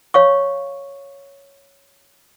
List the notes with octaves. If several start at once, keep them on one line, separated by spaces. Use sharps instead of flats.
C#5 F5 C#6